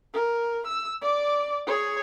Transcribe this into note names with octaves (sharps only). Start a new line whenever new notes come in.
A#4
E6
D5 D6
G#4 C#5